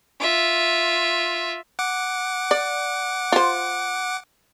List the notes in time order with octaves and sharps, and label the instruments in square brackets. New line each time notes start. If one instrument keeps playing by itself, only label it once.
[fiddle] F4 E5
[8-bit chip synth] F#5 D6
[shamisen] D5
F4 C5